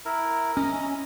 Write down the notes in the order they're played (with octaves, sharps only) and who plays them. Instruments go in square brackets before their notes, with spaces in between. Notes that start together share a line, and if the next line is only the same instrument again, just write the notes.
[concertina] E4 A#4
[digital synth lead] C#4 [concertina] D#5 A#5